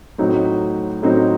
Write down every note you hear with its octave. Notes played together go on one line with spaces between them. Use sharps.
A2 F#3 C4 D#4
A2 F#3 C4 D#4